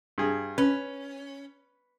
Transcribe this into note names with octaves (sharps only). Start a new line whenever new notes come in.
G2 G#4
C#4 B4